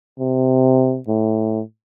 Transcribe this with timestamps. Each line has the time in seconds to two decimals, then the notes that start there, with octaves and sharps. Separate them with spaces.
0.19 C3
1.08 A2